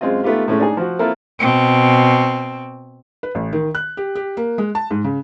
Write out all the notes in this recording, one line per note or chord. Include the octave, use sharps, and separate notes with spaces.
F#2 G#3 C4 F4 D#5
A3 B3 D#4 F4 G4
A2 G#3 A3 C#4
D4 D#4 G#4
F3 F#4
A#3 C4 E4 F4 A4 A#4
B2 C4
B4
A1
D#3
F#6
G4
G4
A#3
G#3
A5
G#2
C#3